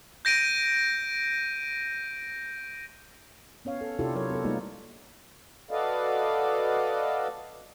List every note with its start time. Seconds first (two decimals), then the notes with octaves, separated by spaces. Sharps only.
0.25 G6 A#6 D7 D#7
3.65 B3 C#4 C#5 F5
3.81 A4
3.99 C3 D4 E4 F4 G4 A4
4.15 F#3 A4 A#4 C#5
4.31 B3 A4
4.44 G3 G#3 A#3 D#4 F4
5.71 F#4 A4 B4 D5 D#5 F5